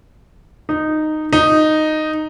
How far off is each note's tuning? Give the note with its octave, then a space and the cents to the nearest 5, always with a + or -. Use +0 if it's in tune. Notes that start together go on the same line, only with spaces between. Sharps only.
D#4 -10
D#4 -5